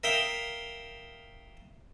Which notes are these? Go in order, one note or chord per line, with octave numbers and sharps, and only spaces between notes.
A#4 E5 F5 G5 D#6